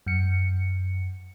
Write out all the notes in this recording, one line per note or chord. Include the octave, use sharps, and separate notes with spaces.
F#2 C#7